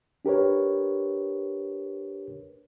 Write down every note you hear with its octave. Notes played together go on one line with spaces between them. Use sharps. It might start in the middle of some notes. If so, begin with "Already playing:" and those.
D4 G4 A#4 B4 C#5